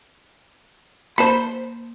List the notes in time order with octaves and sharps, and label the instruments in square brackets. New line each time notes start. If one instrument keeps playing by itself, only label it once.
[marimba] A#3 [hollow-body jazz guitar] C5 A5 B5